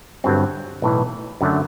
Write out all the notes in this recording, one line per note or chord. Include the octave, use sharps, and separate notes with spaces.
G1 G2 F#3 C4
B1 A2 E3
F#2 D3 F#3 A3